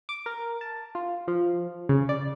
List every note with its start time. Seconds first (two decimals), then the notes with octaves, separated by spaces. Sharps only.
0.09 D6
0.26 A#4
0.61 A5
0.95 F4
1.28 F3
1.89 C#3
2.09 D5